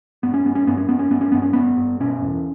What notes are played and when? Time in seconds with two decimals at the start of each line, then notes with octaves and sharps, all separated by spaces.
0.23 G2 B3
0.34 C#4
0.45 G2 B3
0.55 C#4
0.67 G2 B3
0.77 C#4
0.89 G2 B3
0.99 C#4
1.11 G2 B3
1.21 C#4
1.32 G2 B3
1.42 C#4
1.53 G2 B3
1.77 G2
2.00 B2 C#4
2.21 E2